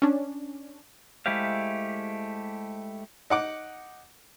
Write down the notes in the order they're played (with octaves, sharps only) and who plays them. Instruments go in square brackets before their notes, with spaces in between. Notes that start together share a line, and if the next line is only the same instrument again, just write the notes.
[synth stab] C#4 D4
[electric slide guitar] G#3 A3 E4 G4 C5 F5
[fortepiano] D#4 F#5 D6